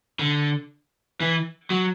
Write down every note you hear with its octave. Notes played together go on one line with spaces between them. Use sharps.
D3
E3
F#3